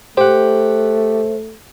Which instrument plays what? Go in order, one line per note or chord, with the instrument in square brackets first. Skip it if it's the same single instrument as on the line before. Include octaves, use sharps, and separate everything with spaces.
[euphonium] A3 [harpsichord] G4 F#5 [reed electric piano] C5